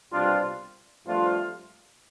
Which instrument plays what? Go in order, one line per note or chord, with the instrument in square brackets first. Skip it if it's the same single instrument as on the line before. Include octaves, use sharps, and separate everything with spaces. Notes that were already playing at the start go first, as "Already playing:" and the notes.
[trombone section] C2 B2 G3 C4 D4 F4
G2 F3 A3 C4 D4 F4